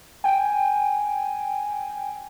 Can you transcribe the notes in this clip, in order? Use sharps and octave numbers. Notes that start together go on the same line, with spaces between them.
G5 G#5